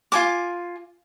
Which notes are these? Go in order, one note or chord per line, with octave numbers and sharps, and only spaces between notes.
F4 G#5 D6